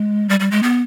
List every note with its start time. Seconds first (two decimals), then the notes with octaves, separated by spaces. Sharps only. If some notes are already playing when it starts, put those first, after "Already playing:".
Already playing: G#3
0.29 G3
0.40 G3
0.51 G#3
0.63 B3